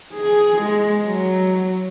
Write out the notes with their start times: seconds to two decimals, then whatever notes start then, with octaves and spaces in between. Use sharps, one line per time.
0.14 G#4
0.61 G#3
1.06 F#3